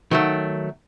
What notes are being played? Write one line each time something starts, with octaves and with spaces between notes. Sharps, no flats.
D#3 F#3 A3